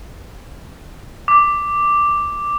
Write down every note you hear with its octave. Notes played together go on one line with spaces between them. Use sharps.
D6